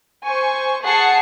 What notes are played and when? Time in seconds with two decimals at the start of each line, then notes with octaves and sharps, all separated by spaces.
0.24 C5 G#5 C#6
0.82 G#4 F#5 A5 C#6 C7 C#7